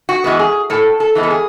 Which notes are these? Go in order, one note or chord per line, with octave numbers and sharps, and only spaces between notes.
F#4
E3 G#3 B3
G#4
A2 A4
A4
E3 G#3 B3
A4
G#4